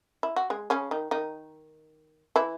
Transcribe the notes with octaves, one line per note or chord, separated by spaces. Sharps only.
E4
F#4
G#3 G#4
C#3 C#4
D#3 D#4
D#3 D#4
E3 E4